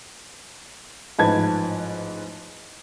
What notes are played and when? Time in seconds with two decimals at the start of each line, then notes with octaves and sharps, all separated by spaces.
1.18 A1 G#2 F3 B4 A5 G#6